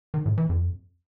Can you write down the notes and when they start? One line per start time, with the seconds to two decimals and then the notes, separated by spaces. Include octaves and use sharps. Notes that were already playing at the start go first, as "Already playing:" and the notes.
0.14 D#3
0.26 A2
0.38 E3
0.49 F2